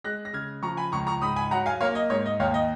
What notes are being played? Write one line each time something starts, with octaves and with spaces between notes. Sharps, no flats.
G#3 F#6 A#6
A#6
C#3 F6 G#6
F3 A#5 C#6
G#5 B5
C#2 A#5 C#6
A#5 C#6
G#2 B5 D#6
G#5 B5
F#3 F#5 A#5
F5 G#5
A#3 C#5 F5
D#5
G#2 C#5
D#5
D#2 C#5 F5
D#5